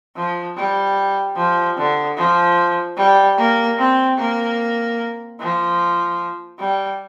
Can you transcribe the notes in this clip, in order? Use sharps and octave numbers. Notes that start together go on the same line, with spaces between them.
F3
G3
F3
D3
F3
G3
A#3
C4
A#3
F3
G3